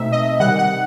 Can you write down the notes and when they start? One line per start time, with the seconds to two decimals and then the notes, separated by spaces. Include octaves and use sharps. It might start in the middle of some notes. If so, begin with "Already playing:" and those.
Already playing: B2 A3 C4 D#4 E5
0.12 D#5
0.40 C3 D#3 G3 F#5
0.59 F#5